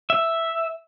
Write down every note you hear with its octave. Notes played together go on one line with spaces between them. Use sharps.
E5